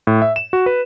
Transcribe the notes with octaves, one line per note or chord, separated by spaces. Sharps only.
A2
E5
E7
F#4
B4